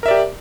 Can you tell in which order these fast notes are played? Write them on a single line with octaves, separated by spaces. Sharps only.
A#4 E5 D5 G4